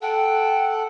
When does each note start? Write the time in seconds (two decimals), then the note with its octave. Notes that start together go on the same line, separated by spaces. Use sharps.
0.02 A4 F#5 G5